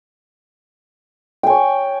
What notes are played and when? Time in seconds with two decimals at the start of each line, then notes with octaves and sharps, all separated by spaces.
1.43 G5
1.47 G#5
1.50 C#5